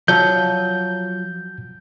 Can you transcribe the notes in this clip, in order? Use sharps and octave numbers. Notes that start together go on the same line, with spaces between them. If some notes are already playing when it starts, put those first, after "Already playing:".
F3 F#3 G6